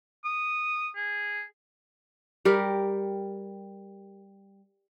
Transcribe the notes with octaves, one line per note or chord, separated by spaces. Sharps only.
D#6
G#4
G3 G4 A#4